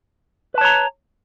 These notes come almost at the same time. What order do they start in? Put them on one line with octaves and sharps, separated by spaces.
B4 A5 C#5 A#5